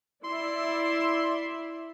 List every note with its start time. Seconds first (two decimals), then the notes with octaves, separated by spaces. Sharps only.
0.24 E4 D5 E5 C6